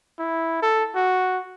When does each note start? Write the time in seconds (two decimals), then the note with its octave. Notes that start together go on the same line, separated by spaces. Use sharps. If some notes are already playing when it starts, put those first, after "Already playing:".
0.19 E4
0.63 A4
0.95 F#4